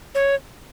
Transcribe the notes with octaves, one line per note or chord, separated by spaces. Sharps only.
C#5